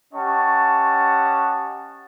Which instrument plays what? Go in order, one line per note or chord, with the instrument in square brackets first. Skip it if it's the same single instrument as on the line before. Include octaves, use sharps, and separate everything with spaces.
[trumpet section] C#4 G4 D#5 F#5 A5 C#6